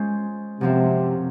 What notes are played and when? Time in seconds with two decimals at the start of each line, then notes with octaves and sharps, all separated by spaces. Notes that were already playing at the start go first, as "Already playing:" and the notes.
Already playing: G#3 C#4 F4 G#4 C5
0.61 F#2 C3 F3 C4